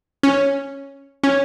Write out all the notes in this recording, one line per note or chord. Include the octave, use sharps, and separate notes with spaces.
C#4
C#4